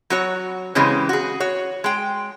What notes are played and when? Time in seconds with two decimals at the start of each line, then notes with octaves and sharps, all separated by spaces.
0.10 F#3 F#4 C#5
0.75 C#3 E3 G#3 C4 C#4 G4
1.09 F#4 G#4
1.40 F#4 C#5
1.84 G#3 G5